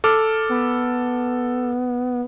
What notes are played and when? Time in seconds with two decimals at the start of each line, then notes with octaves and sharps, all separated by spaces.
0.04 A4 D6 F6
0.49 B3